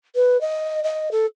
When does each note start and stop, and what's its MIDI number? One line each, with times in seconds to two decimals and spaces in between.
0.15 0.40 71
0.41 0.80 75
0.83 1.09 75
1.11 1.26 69